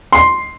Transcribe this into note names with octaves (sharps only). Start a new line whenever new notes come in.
C6